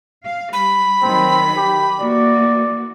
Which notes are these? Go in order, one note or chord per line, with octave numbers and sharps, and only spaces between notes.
F5
G3 B5
D#3 F#3 C4
G4
E3 A#3 F#4 D5